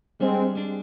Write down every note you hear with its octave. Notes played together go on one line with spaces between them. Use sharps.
G3 G#3 C4 D4 G#4
G3 D4 G#4